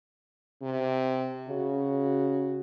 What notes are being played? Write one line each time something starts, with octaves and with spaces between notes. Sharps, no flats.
C3
C#3 F#4